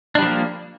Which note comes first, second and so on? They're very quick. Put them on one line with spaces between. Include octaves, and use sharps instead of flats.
D4 G3 F3 A#3